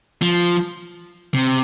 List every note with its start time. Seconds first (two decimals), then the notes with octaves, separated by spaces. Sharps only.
0.22 F3
1.34 C3